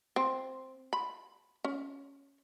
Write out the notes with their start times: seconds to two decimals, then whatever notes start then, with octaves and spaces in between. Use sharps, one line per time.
0.16 C4
0.93 B5
1.64 C#4